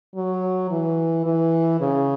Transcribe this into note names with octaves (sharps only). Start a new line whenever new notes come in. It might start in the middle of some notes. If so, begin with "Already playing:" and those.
F#3
E3
E3
C#3